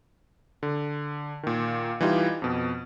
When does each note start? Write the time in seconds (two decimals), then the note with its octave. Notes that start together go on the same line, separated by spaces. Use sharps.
0.63 D3
1.43 A#2 D#3
2.01 E3 G3 D#4 F4 G4
2.42 F2 B2